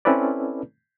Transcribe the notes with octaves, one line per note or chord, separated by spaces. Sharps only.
C4 C#4 E4 A4 B4 D5